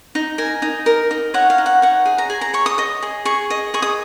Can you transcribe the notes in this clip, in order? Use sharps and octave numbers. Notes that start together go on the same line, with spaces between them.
D#4
A#4 G#5
D#4
A#4
D#4
C#5 F#5
F5
D#4
F#5
C#5 F#5
G#4
A#5
G#4 G#5
A#5
C#5 C#6
D#6
D#5 D#6
G#4
G#4 C#6
D#5
G#4 C#6
D#6